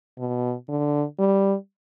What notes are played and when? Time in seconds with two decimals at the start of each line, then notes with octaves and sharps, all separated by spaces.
0.18 B2
0.68 D3
1.19 G3